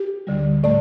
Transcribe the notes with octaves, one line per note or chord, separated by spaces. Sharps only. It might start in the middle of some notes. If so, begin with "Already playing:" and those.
Already playing: G4
D2 D3 G3
A2 A3 D5